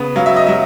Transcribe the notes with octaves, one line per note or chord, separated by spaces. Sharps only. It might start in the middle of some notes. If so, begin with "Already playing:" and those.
Already playing: C#3 B3
F#3 F5
E5
D#5
F#3 E5